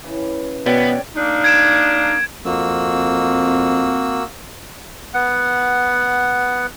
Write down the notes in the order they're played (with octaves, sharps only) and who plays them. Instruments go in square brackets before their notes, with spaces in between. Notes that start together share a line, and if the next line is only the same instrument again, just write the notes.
[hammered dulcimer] C#3 E3
[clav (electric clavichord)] B2 [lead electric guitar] B3 [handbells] C#5 D5 G5
[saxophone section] A#3 D4 D#4
[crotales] G#6 D7 E7
[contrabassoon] F2 [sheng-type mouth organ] A#3 F#4 E6 [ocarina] C4
[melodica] B3 F#5